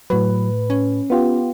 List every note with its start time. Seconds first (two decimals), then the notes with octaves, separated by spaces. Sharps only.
0.10 A2 F#3 B4
0.70 C#4
1.10 B3 F4 G4